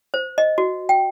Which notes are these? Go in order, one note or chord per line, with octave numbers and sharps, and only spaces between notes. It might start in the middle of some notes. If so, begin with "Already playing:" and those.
C5
D#5
F#4
G5